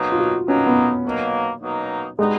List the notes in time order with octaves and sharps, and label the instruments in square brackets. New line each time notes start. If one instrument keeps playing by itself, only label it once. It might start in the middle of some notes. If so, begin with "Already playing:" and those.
Already playing: [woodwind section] B2 F#3 A#3 D#4
[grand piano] F4
F#4
[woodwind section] B2 F#3 A#3 D#4 [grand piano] C#4
[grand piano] B3
[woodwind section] B2 F#3 A#3 D#4
B2 F#3 A#3 D#4
[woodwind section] G3 B3 D#4 F#4 [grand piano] G#3